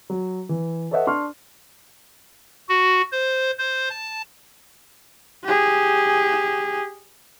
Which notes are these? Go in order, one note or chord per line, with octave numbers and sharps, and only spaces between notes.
F#3
E3
A4 B4 C#5 D#5 E5 F#5
D4 C6 C#6 F6
F#4
C5
C5
A5
G4 G#4